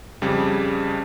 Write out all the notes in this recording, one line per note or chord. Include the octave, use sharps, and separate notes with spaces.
F2 C#3 G3